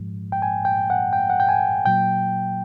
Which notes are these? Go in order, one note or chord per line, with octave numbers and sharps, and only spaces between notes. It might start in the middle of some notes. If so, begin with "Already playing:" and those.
Already playing: G#2 F3 G#3
G5
G#5
G5
F#5
G5
F#5
G5
G#5
A#2 F#3 A#3 G5